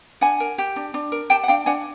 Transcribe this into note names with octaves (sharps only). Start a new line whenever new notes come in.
D4 F#5 G#5
A#4
G4
D4
D4
A#4
G4 G5 A5
F#5
D4 F5 G5
D4 F#5 G#5